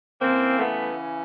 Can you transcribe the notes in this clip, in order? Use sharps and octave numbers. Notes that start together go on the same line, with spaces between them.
C#3 E3 A#3 C4
A3 B3